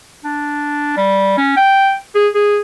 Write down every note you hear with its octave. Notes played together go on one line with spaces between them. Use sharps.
D4
G3
C#4
G5
G#4
G#4